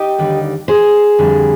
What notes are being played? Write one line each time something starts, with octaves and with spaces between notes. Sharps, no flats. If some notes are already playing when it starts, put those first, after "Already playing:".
Already playing: D#4 G4
D#2 D3 G3
G#4 C5
F2 D3 G3